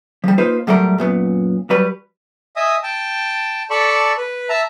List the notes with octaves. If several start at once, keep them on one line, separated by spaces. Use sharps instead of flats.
F3 G3
A#3 D#4 F4 B4 C5
A2 F#3 G3 A3 A#4
F#2 A#2 B3
F#3 G3 B4
D#5 E5 G#5 D#6
G5 A5
A4 D5 A5 B5 C#6
B4
E5 A5 A#5